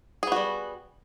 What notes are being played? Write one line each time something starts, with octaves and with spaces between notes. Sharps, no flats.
G3 B3 F#4 G#4